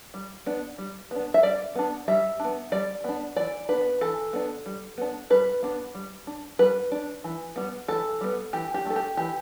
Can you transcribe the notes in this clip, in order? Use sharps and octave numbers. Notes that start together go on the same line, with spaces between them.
G3
B3 D4
G3
B3 D4
E5
G3 D5
B3 D4
G3 E5
D4
B3
G3 D5
B3 D4
E3 D5
B3 D4 B4
E3 A4
B3 D4
G3
B3 D4
G3 B4
B3 D4
G3
D4
G3 B4
D4
E3
G3 B3
E3 A4
G3 B3
E3 G4
G4
A3 D4 A4
G4
E3 G4